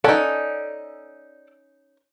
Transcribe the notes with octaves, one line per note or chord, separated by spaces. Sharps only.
C#4 D#4 A4 D5 F#5